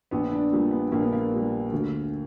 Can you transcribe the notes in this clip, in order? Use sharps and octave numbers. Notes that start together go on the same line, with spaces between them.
A#1 B3
D4
A#2 G3
B3
A#1 A#3
B3
A#3
A#2 G3
D2